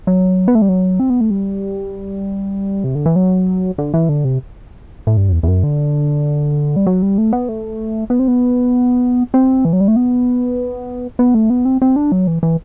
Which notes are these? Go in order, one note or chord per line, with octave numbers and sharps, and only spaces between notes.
F#3
B3
A3
G3
F#3
C4
B3
A3
G3
C3
D3
E3
F#3
D3
E3
D3
C3
A2
G2
F#2
E2
E2
F#2
D3
G3
F#3
G3
A3
B3
A3
B3
C4
B3
C4
E3
F#3
G3
A3
B3
B3
A3
B3
C4
C4
D4
F#3
E3
E3